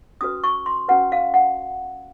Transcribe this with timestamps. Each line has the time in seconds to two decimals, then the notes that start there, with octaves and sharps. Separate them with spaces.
0.21 C#4 F#4 B4 D#6
0.44 C#6
0.66 C6
0.89 C#4 F#4 B4 F#5
1.12 F5
1.34 F#5